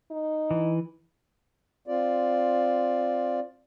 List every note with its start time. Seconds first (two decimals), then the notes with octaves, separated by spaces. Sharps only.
0.11 D#4
0.51 E3
1.87 C4 F4 D5